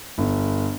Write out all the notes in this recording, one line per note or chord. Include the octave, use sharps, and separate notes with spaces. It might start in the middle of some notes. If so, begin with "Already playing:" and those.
G1